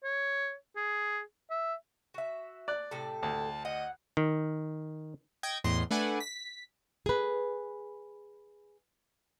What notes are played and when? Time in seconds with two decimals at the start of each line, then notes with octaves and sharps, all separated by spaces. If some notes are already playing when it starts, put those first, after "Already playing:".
0.04 C#5
0.76 G#4
1.50 E5
2.14 F#4 E5
2.68 D5 F#6
2.91 A2 C3 A4
3.23 D2 A5
3.65 D#5 F#5
4.17 D#3
5.43 D#5 G5 G#6
5.64 E2 A2 D#5 C6
5.91 A3 D4 B4 D5 F#5 G#5
6.20 B6
7.06 G#4 B4